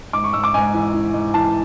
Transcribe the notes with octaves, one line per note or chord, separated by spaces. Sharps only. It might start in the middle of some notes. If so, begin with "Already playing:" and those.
G#2 D6
C#6
G#2 E6
D6
G#2 G#5
E3
E3
G#2
E3 A5